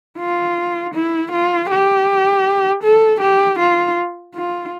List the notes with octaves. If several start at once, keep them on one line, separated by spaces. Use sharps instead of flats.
F4
E4
F4
G4
A4
G4
F4
F4